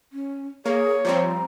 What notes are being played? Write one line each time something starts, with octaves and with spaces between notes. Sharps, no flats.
C#4
A#3 G#4 C#5
F3 G3 C4 A#5